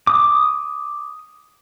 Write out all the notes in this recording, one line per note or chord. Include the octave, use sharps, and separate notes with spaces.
D6 D#6